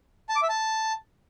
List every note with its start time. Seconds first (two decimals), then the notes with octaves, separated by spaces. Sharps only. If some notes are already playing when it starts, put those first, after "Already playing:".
0.29 A5
0.36 D6
0.43 E5
0.49 A5